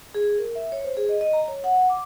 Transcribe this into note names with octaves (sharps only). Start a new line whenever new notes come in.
G#4
A#4
E5
C#5
C5
G#4
D#5
D#5
A#5
C#5
F#5
D6